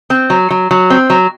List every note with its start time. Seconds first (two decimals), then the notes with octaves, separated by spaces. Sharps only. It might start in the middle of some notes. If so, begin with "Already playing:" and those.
0.10 C4
0.30 F#3
0.50 F#3
0.71 F#3
0.90 C4
1.10 F#3